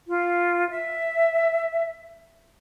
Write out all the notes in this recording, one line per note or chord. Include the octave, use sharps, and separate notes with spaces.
F4
E5